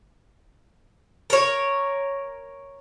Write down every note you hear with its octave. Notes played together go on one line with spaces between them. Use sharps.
A#4 C#5